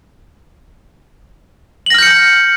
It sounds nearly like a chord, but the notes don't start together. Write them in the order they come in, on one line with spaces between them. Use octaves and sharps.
F#7 A#6 F6 G6 C#7